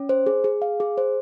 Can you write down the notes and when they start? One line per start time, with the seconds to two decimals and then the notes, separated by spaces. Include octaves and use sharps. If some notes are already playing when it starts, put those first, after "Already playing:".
Already playing: C#4
0.09 C5
0.26 G#4
0.44 G#4
0.62 F5
0.80 G#4
0.98 C5